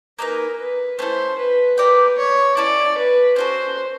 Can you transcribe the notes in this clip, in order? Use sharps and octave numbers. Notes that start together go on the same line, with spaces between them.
A#3 D#4 G#4 A#4 B4
B4
A3 C#4 E4 A4 C5
B4
G4 A#4 B4 D5 G5
C#5
C#4 E4 A4 D5
B4
C#4 F#4 A4 C5